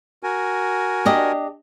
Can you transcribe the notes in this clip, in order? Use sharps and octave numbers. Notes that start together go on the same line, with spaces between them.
F#4 A#4 G#5
D4 G4 D#5